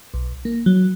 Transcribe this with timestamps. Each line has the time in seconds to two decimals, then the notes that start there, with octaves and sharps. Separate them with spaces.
0.14 B1
0.45 A#3
0.66 F#3